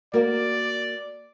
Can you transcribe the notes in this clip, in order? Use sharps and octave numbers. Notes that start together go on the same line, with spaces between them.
A#3 F#4 A#4 D5